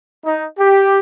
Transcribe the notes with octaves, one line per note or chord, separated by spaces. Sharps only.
D#4
G4